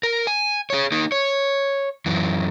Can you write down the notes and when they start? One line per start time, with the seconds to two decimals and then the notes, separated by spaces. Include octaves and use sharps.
0.03 A#4
0.27 G#5
0.70 G#4 C#5
0.92 A#3 D#4
1.12 C#5
2.06 F#2 E3